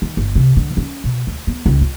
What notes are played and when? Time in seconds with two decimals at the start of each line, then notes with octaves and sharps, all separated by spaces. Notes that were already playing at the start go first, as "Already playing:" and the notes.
0.02 D#3
0.17 G1
0.35 C3
0.57 D3
0.77 C#4
1.04 B2
1.27 D2
1.47 B3
1.66 C#2
1.81 F4